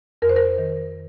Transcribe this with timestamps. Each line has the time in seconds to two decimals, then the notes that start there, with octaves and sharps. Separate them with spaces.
0.22 F2 A#4
0.29 C5
0.36 A#4
0.58 D#3